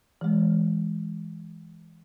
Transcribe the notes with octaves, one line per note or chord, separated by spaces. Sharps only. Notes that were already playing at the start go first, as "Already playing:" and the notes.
E3 G#3